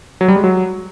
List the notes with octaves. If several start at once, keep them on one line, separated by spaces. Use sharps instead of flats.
F#3
G3
G#3
F#3